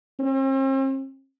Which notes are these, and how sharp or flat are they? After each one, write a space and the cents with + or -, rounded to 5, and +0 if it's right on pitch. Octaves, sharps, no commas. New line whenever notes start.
C4 +45